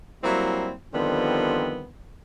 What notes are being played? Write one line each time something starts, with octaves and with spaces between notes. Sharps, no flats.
F#3 G3 A#3 C4 E4
D3 D#3 F3 G3 B3 C4